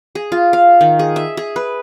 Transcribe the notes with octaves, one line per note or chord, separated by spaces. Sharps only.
G#4
F4
F5
D#3
G#4
E5
G#4
B4